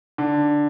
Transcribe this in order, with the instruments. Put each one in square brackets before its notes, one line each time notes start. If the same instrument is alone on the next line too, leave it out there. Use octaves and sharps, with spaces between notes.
[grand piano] D3